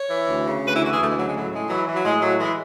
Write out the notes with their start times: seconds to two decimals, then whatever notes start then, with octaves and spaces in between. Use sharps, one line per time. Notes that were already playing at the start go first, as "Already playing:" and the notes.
Already playing: C#5
0.11 E3
0.29 D2
0.46 C#3
0.64 D2 B4
0.73 E4
0.82 E3 F#4
0.90 G#4
1.00 D2 A3
1.07 G#3
1.17 C#3 F#3
1.25 G#3
1.34 A2 F#3
1.52 A2 G#3
1.69 E3 F#3
1.87 E3
1.95 F#3
2.05 A2 G#3
2.22 A2 F#3
2.40 E3 G#3